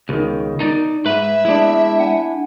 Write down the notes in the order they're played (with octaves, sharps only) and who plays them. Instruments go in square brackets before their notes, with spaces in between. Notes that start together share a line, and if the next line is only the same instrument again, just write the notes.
[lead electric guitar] C#2 [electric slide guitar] B2 D#3
[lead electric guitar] D#4 D5
[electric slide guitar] G#2 [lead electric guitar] B4 B5 [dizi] E5
[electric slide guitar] G#3 B3 D5 [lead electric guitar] D4 E4
[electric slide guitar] F#5 G#5